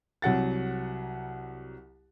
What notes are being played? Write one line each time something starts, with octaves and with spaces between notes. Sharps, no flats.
C2 F#3 F#5 A6